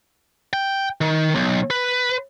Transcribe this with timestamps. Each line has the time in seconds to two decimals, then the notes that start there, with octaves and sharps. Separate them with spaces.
0.53 G5
1.01 D#3
1.35 B1
1.70 B4